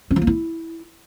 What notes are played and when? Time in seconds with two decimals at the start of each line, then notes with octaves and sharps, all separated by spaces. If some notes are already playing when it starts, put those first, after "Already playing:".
0.11 C#4
0.16 F3
0.22 A#3
0.27 E4